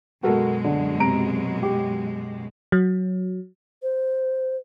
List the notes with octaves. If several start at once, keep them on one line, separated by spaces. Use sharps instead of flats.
F#2 B2 G#3 F#4 A4 A#4
D3
C3 A#5 D7
G4
F#3
C5